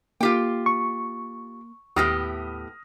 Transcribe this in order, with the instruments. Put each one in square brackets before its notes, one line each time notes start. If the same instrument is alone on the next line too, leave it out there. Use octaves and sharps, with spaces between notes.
[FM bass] A#3 [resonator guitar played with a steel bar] F4 G4 G5
[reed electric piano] C#6
[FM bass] D#2 [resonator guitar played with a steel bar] A2 B3 G4 [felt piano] D#6 F6 A#6